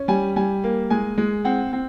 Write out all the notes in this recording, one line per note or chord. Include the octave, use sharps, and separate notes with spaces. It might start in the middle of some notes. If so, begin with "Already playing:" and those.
Already playing: C#4
G3 G#5
G3 G#5
A#3
G#3 G#5
G#3
C4 F#5
C4